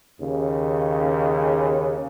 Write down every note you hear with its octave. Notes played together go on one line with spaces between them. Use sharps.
D#2 C#3